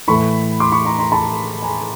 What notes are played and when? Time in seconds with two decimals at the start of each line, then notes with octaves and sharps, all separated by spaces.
0.08 A2 E3 A3 B5 C#6
0.60 C6 D6
0.72 B5 C#6
0.85 A#5 C6
0.98 A#5 C6
1.12 A5 B5
1.62 G#5 A#5